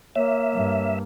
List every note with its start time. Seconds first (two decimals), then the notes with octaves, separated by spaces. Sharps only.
0.16 A#3 C#5 E5
0.52 G2